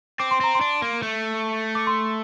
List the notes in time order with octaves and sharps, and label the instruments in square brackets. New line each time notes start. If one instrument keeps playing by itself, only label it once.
[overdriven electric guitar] C4 [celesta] D6
[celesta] C6
[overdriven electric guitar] C4 [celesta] A#5
[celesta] C6
[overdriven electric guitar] D4
A#3
A3
[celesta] D6
C6